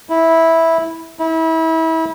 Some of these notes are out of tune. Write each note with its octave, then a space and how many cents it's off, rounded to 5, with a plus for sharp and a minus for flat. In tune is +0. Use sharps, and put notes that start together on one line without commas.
E4 -10
E4 -30